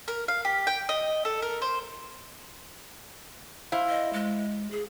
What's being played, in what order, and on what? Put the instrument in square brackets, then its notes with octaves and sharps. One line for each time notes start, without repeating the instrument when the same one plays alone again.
[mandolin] A#4
F5
G4
G5
D#5
A4
A#4
C5
[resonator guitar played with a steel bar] E4 C5 F5
[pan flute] D#5
G#3
G#4